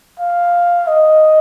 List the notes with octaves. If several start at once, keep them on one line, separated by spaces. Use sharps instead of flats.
F5
D#5